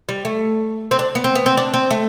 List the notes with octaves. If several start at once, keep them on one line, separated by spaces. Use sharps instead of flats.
G3
A3
C4
D4
B3
C4
B3
C4
D4
C4
A3